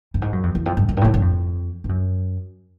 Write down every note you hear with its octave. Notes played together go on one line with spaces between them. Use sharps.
G2
G#2
F#2
F2
E2
F2
G2
F#2
G2
A2
G#2
G2
F2
G2
F#2